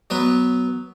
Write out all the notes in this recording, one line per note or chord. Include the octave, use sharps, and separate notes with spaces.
F#3 B3 B4